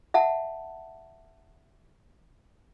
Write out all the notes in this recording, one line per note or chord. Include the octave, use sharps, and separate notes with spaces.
E5 F#5 A5